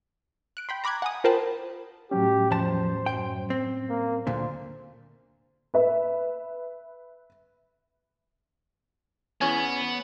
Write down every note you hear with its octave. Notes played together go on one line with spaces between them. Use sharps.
F#6 D7
G5 B5 C6
A#5 B5 D6 F#6 G#6
F#5 G#5 D#6
F4 A#4 C5 G5 A5 B5
A2 F#3 C#4 G4
E2 F3 C5 A5
F#2 G5
C4
A#3
D2 A#2 D3 C5
B4 E5
E2 B3 C#4 G#5